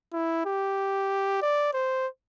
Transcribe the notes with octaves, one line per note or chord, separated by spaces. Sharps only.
E4
G4
D5
C5